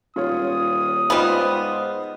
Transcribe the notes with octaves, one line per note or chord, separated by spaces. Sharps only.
D#1 F4 C#5 D#6
G#2 G3 B3 F4 C5 D#5